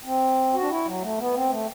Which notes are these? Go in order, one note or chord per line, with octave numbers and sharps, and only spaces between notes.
C4
F#4
D4
E4
F#3
A3
B3
C4
A3